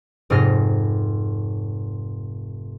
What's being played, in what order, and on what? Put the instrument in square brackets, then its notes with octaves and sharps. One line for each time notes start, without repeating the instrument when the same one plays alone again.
[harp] F1 G#2 D#5 F6 A#6